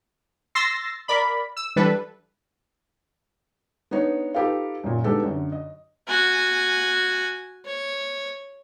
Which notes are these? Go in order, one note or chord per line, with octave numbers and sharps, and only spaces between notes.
C6 E6 A6 A#6 C7
A#4 D5 B5
E6
E3 G3 D4 A4 B4
B3 D4 D#4 C#5
D#4 F4 G4 A4 B4 F5
F#2 A#2
G#3 B3 D4 D#4 G4 A4
F#2 D3
D#5
F#4 G#5
C#5